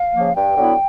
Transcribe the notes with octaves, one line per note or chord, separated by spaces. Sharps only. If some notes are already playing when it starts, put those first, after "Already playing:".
Already playing: F5
C#3 F3 A#3
G2 G5
D3 F#3 B3 E4